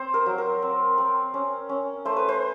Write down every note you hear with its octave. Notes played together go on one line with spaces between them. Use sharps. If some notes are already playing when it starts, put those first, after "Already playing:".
Already playing: C4 C5
A#4
F#3
A#4
C4
C4
C#4
C#4
A3 C5
B4
C5